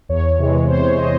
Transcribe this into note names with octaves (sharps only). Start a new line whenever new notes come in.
E2 C#5
C3 E3 G#3
E2 C5
C#5
C3 E3 G#3 D#5